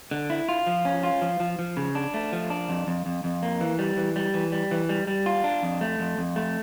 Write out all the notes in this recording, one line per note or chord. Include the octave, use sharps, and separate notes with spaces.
D3
E4
F4
F3
C#4
F4
F3
F3
F3
C#3
D4
A3
F3
D4
F2
F2
F2
F2
A#3
E3
G3
E3
G3
E3
G3
E3
G3
G3
F4
D4
F2
A3
F2
F2
A3